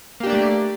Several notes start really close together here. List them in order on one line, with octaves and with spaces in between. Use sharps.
A#3 G4 D4 D5 A3